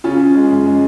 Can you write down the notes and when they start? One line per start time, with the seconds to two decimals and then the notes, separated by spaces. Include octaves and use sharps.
0.04 C#3 C#4 F4
0.20 C#3
0.35 G#3
0.50 F#2
0.66 G#3